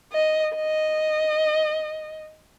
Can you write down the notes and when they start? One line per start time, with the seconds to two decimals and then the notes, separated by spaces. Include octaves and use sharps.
0.13 D#5
0.56 D#5